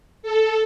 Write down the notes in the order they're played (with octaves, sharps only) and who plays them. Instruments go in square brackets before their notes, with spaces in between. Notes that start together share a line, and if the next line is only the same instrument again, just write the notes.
[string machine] A4